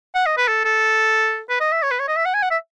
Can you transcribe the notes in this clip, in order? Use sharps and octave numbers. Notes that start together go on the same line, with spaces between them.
F#5
D#5
B4
A4
A4
B4
D#5
E5
C#5
B4
C#5
D#5
E5
F#5
G#5
F#5
E5